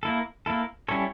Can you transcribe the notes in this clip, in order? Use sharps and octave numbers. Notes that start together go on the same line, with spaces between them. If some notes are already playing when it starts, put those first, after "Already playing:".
A#3 E4 A4
A#3 E4 A4
G3 C#4 E4 A4 C#5